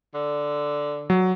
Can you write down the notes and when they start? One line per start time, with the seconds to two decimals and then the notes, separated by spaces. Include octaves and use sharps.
0.14 D3
1.10 F#3